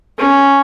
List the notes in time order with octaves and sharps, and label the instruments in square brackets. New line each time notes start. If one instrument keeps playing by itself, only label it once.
[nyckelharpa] C#4